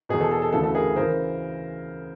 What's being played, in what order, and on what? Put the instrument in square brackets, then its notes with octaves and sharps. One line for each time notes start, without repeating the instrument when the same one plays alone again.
[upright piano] E2 B2 G#4
A4
A4
A4
D2 C#3 E3 A4
A4
G#4 A#4
C#3 E3 A#4 C5